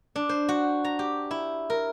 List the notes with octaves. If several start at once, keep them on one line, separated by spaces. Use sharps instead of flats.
D4
C5
F#4
A#5
G4
E4
A#4